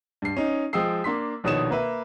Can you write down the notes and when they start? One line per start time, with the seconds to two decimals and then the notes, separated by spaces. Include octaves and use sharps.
0.22 G2 C7
0.37 C#4 D#4
0.73 F3 G#3 G5 D#6 E6 C7
1.04 A#3 D4 C6 B6
1.44 A#1 B2 D#3 C#5 D#6 E7
1.71 A#3 B4 E5